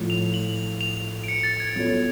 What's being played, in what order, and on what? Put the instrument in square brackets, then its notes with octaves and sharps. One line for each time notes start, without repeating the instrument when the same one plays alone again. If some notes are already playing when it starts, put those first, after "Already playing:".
Already playing: [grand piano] A2 F3 A3 F4
[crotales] F7
F#7
F7
D7
C#7
A6
G#6
[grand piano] F#3 B3 F4 A4 C#5